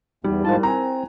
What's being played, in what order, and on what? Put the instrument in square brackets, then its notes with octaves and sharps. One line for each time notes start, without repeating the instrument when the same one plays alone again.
[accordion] E2 [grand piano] G3 [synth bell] D#4
[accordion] G#2 F3 A5 [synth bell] E4 A#4
[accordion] C4 [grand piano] G#5 A#5